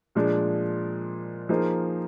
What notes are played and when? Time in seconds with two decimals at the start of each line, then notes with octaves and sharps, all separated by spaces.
0.15 A#2 F3 G#3 D4
1.49 F3 A#3 D#4 G#4 C5